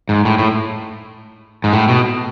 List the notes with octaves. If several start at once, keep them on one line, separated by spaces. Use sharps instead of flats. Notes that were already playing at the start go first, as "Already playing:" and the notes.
G#2
A2
A2
G#2
A2
B2